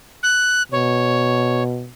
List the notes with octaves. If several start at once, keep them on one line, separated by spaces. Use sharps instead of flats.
F#6
B2 C#5